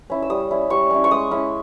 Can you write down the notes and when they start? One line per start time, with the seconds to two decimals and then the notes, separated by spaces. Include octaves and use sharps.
0.10 C#4 E4
0.22 E6
0.30 G3 D#6
0.51 C#4 E4
0.70 G3 C#6
0.90 C#4 E4
1.04 C#6
1.11 G#3 D#6
1.31 C#4 E4